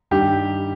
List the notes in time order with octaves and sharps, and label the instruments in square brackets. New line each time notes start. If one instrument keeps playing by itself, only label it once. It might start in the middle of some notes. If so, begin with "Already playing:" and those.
[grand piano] G2 D#3 G3 G4